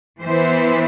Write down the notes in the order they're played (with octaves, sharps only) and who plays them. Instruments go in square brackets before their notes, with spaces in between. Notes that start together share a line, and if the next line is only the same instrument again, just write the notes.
[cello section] E3 B3 E4 C5